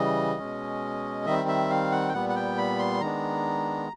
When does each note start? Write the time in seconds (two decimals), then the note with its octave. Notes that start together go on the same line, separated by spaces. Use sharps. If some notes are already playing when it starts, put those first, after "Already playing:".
Already playing: C#3 E3 G3 D#5
0.38 B2 G#3 C#4
1.26 D#3 G3 C4 E5
1.48 E5
1.70 F5
1.92 F#5
2.09 G5
2.13 A#2 G3 B3 F#5
2.29 F#5
2.36 G5
2.58 B5
2.79 C6
3.01 D#3 G#3 B3 D4 A#5